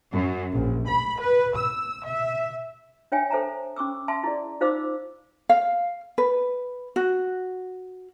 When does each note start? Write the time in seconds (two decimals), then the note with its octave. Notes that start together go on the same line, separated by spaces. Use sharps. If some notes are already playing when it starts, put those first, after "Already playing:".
0.12 F#2
0.51 A#1
0.87 B5
1.19 B4
1.57 E6
2.05 E5
3.12 D4 C#5 E5 G5 G#5
3.31 A4 C5 E5 A5 A#5
3.76 C#4 C#6 D6 E6
4.08 E5 A5 C6
4.24 E4 G#4 D5
4.61 D#4 F4 C5 F5 D6 E6
5.49 F5
6.18 B4
6.96 F#4